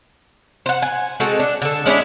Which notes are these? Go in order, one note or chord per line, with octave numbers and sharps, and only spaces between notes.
C5 F#5
G#5
G#3 C4 F#4 A4
D4
D3 A4
G#3 C#4 D4 E4